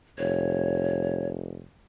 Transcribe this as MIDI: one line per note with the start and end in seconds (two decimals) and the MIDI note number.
0.18 1.65 29
0.18 1.29 73